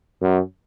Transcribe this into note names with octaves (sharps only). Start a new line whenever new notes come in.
F#2